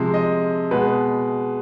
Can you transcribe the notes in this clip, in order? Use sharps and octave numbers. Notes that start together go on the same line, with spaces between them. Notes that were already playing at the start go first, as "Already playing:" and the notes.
Already playing: C3 F3 G#3
D#5
B2 G#3 B4